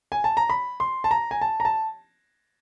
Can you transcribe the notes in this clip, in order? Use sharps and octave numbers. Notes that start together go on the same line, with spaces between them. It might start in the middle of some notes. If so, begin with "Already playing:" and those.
G#5
A5
A#5
B5
C6
A5
A#5
G#5
A5
A#5
A5